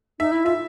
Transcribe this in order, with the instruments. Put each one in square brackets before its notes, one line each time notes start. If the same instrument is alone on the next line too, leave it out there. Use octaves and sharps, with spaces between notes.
[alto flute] D#4 [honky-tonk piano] E5
[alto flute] E4
[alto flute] F4 [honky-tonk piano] E5